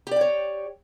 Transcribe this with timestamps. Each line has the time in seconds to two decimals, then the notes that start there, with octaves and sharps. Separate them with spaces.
0.07 G4
0.11 D5
0.16 G5
0.21 C#5